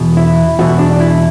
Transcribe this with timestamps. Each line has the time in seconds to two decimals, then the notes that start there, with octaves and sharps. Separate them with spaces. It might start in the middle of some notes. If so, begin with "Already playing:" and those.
Already playing: E2 B2
0.17 E4
0.59 E2 B2 F#4
0.79 D4
1.00 E4